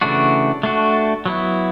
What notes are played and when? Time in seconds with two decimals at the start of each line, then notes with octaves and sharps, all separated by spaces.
0.01 C#3 E3 A3 D4 F#4
0.63 A3 D4 F#4
1.26 F#3 B3 E4